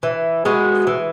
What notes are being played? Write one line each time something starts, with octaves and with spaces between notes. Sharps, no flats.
E3
G#3 B3 F#4
E3